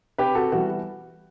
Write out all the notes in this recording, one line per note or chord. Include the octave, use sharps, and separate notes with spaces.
C3 G4 B4
F#4 A4
E3 G3 B3 F#4